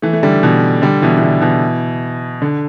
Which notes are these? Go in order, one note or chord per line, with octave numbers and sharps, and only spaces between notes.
E3 A3
A3
D3 G3
B2 E3
D3 G3
B2 E3
E3
D3
B2 E3
D3